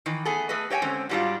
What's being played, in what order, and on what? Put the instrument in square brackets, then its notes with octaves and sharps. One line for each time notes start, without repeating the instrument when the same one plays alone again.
[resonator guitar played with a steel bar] D#3 E3
A3 B3 G#4 A4
A3 G#4 A4 B4 D#5
G4 C#5 D#5 G5 G#5
D3 G#3 C4 C#4
G#2 F#3 G3 A3 D4 F4